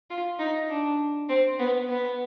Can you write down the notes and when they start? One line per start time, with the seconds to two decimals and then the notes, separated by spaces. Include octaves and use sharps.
0.10 F4
0.39 D#4
0.70 D4
1.29 C4
1.59 B3
1.89 B3